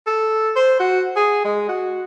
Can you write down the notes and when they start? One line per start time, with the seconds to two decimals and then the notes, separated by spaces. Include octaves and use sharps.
0.07 A4
0.56 C5
0.80 F#4
1.16 G#4
1.45 G#3
1.69 F#4